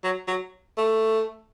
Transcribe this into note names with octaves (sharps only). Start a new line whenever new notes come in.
F#3
F#3
A3